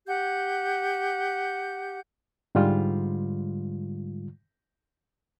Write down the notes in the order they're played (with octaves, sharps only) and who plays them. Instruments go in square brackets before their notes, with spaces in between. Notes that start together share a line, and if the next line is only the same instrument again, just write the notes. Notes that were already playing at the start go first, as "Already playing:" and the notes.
[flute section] G4 F#5 G6
[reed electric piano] G#2 D3 G3 G#3 F4